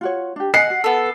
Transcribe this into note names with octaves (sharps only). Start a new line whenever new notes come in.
F4 F#4 C#5
D4 G4
D#5 F#5 G#5 C7
F#4
B3 A4